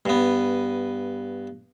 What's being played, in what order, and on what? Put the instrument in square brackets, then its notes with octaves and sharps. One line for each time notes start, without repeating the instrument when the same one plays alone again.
[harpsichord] G2 B3